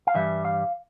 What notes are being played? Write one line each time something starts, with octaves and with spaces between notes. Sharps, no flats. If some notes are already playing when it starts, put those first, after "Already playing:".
F5
G2 E3 G3 E5
F5